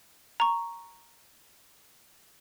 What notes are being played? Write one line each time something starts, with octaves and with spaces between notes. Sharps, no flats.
A#5 C#6